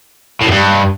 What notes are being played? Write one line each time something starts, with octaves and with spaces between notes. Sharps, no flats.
A2
F#2
G2